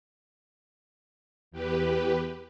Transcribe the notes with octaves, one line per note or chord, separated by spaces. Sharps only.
E2 G4 B4